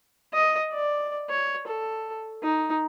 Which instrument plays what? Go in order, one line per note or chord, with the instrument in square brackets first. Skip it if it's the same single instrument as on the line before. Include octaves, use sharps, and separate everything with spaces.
[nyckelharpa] D#5
D5
C#5
A4
D#4